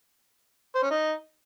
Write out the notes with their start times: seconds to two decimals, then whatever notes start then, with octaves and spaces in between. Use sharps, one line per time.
0.75 C5
0.83 C#4
0.90 D#4